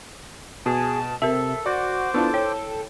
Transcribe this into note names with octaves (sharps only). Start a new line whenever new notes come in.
B2 G#4 A5
C3 A4 A#4 E5 A5
F#4 C5 D5 D6
B3 D4 E4 F4 A4
C#5 G5